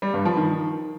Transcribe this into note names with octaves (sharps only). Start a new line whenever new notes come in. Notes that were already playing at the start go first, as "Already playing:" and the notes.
G3
G2
F3
D#3